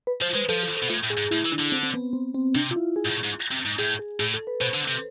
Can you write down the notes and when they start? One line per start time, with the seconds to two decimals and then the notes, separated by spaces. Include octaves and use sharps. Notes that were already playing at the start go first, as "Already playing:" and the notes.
0.07 B4
0.22 F3 C5
0.35 G#3 B4
0.49 F3 A4
0.63 A4
0.77 A4
0.83 B2
0.90 A2 F4
1.04 A2
1.10 G#4
1.18 G#2
1.31 A2 E4
1.45 E3
1.52 D4
1.59 D3
1.72 C4
1.83 C4
1.94 B3
2.13 C4
2.34 C4
2.55 C3 D4
2.71 F4
2.76 E4
2.96 G#4
3.06 G#2
3.10 A2
3.24 G#2
3.51 C3
3.65 G#2
3.79 A2 G#4
3.99 G#4
4.19 A2 G#4
4.34 A4
4.47 B4
4.61 B2 C5
4.74 D3
4.88 C3